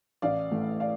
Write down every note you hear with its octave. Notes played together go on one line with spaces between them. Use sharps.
A1 D5 F5
A2 E3 A3
D5 F5